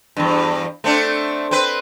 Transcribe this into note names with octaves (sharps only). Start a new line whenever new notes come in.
E2 G2
A3 C4 D4
C4 B4